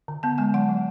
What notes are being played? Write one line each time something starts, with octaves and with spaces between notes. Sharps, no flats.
D3
B3 A5
G#3 G#5
F#3 F#5
F#3